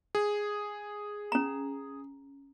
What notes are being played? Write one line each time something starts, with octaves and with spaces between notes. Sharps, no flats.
G#4
C#4 A#5